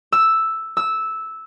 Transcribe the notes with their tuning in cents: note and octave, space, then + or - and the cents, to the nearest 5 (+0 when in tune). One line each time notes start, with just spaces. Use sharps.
E6 +0
E6 -10